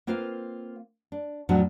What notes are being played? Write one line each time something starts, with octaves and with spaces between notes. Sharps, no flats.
A#3 C4 F4 B4 C5 F5
D4
F2 A2 F3 F#3 B3 D4